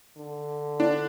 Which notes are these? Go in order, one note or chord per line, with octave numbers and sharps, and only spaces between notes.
D3
D4